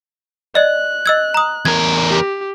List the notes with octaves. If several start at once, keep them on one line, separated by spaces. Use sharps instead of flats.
D5 D#5 F#6
D#5 E6 G#6
A#5 D#6
E2 A#4 G#6
G4